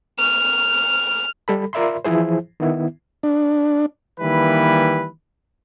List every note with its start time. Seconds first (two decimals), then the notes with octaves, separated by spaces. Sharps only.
0.19 F6
1.48 G3 A4 B5
1.73 F4 A#4 D5 E5 B5 C6
2.05 E3 F3 E4 G#4 C5
2.60 D#3 B3 E4
3.23 D4
4.20 D#3 E3 G3 A#3 E4 B4